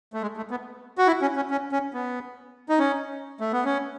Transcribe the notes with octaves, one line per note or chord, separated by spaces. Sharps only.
A3
G#3
A3
B3
F#4
E4
C#4
C#4
C#4
C#4
B3
D#4
C#4
A3
B3
C#4